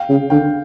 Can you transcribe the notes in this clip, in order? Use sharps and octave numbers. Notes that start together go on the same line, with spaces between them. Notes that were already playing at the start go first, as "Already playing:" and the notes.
Already playing: F5 G5
C#3
D3 F5 G5